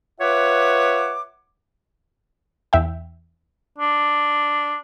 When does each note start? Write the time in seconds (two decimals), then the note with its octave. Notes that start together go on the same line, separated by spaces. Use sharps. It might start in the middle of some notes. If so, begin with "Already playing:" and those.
0.21 F4 B4 C#5 E5 F#5 D6
2.73 E2 E5 G5
3.78 D4